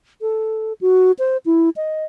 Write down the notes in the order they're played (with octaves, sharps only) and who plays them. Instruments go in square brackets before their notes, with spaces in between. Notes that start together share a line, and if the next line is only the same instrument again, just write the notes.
[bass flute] A4
F#4
C5
E4
D#5